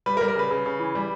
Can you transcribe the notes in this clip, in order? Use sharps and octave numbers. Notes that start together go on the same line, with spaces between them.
G3 B4
A#4
G3
A#4
C#3 B4
C#3
C#3
E3
G3